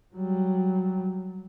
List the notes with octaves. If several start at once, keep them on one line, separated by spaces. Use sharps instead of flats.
F#3 G3